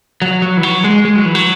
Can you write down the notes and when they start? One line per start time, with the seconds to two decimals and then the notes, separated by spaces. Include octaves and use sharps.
0.22 F#3
0.42 F#3
0.57 E3
0.63 F#3
0.84 G#3
1.05 G#3
1.16 F#3
1.26 E3
1.35 F#3